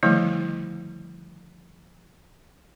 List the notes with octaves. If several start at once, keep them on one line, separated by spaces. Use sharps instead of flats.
D3 D#3 F3 G3 A3 E4